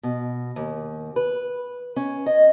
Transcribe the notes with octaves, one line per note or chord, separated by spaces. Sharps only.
B2
D#2
B4
C#4
D#5